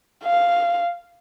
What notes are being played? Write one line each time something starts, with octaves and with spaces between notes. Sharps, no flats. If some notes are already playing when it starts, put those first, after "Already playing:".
F5